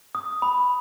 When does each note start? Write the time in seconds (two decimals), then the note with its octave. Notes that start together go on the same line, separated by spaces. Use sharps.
0.15 D#6
0.42 B5